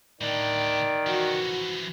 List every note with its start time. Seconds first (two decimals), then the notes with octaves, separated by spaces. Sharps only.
0.21 A2 D3 D#3 D5
1.07 E3 F3 F#4